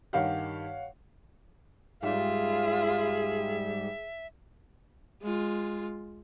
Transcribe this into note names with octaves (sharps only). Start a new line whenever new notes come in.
G2 D#3 G4 C#5 F5 F#5
G#2 G3 F4 G#4 E5
G#3 F4